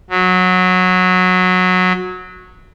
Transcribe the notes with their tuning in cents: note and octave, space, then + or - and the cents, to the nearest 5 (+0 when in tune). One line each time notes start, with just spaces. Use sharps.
F#3 -15